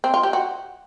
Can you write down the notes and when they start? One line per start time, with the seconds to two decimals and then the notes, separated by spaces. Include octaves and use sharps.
0.04 C4
0.14 F4
0.23 G4
0.33 F#4